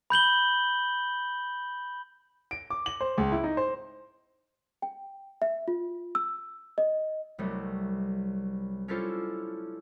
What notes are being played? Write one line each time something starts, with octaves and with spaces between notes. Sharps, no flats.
B5 G6 F#7 G7
D7
D6
F#7
C5
C#2
E4
D#4
C5
G5
E5
F4
E6
D#5
C2 F#3 G3 A3
C#4 D4 E4 F4 A4 C5